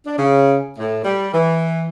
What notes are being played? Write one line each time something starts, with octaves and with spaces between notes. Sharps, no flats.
D4
C#3
A2
G3
E3